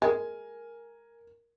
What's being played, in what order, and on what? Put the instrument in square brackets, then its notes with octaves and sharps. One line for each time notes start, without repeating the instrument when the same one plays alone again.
[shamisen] G#3 [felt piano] A#4 [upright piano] G#5